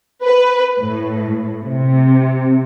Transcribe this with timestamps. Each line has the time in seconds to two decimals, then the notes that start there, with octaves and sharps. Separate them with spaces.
0.23 B4
0.80 A2
1.63 C3